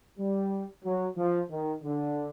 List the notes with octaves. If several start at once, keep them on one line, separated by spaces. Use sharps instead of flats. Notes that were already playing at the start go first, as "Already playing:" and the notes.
G3
F#3
F3
D#3
D3